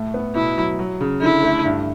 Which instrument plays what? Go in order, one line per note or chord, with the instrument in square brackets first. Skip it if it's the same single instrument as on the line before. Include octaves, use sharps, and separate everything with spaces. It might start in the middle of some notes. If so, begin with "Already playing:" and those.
Already playing: [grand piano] A2 A3
B3
[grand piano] B2 [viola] E4
[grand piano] F#3
F#3
C#3
[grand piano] D3 [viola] E4
[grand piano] A3
G2